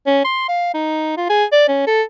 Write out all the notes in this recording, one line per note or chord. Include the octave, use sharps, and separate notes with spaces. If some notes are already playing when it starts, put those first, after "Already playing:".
C#4
C6
F5
D#4
F4
G#4
D5
C#4
A4